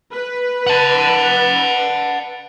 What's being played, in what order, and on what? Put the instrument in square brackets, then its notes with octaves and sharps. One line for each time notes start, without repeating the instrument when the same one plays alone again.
[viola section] B4
[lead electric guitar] F#5 A5